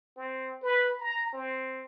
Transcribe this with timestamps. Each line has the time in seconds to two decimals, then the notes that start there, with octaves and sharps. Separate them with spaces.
0.16 C4
0.62 B4
1.00 A#5
1.33 C4